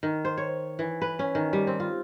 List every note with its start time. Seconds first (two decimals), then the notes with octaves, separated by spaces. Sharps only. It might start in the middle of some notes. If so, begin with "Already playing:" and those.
0.03 D#3
0.25 C5
0.38 C#5
0.79 E3
1.02 B4
1.19 C#4
1.35 D#3
1.53 G3
1.67 C4
1.80 F4